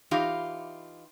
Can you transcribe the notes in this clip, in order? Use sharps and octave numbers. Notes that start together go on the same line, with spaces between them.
E3 D#4 F4 G4